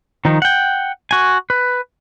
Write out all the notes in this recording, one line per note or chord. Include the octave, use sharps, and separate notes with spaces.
D#3 F3 D#4
F#5 G5
F#4 G#5
B4